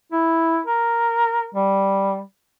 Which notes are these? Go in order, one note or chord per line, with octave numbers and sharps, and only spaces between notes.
E4
A#4
G3